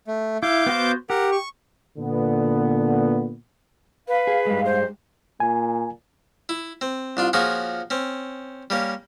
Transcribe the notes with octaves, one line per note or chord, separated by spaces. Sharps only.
A3
E4 F5 D6 G6
B3 F#4 C5
G4 A#4 F#5
C#6
A#2 D3 B3
B4 F5
G#4
G2 G#3
C5
A#2 G#5
E4
C4
C2 D4 F4
F3 A#3 C#4 F4 F#4 G#4
C4 C#4
G3 A#3 C#4